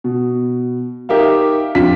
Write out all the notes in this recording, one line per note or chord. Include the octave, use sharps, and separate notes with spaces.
B2
D#4 G4 A#4 E5 F5
F2 D4 F4 B6